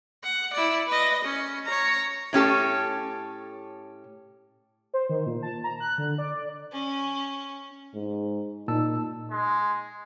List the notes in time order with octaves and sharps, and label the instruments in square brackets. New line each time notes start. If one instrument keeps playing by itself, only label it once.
[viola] F#5
E4 D5
B4 D#5
C#4
C#5 A#5
[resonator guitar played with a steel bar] A2 C#4 G4 A4
[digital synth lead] C5
D#3
A#2
A5
A#5
F#6
D3
D5
[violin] C#4
[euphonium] G#2
[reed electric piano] A#2 A5 E6 [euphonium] D#4
[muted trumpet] G#3